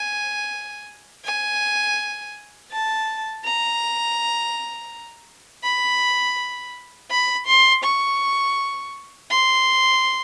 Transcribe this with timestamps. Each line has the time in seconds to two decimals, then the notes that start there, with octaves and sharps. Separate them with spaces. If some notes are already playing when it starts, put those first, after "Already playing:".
Already playing: G#5
1.24 G#5
2.71 A5
3.44 A#5
5.64 B5
7.10 B5
7.46 C6
7.83 C#6
9.30 C6